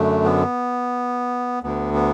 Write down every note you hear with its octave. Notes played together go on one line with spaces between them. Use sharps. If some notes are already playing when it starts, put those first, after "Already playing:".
Already playing: F#2 D3 A3
B3
D2 D3 B3
B3